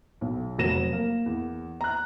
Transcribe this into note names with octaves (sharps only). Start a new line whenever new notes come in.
B1
F1 F#3 A#6 E7
A#3
E2
A#5 F#6